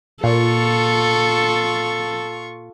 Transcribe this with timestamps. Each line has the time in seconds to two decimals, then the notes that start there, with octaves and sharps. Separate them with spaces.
0.24 A#2 F4 A4 C#6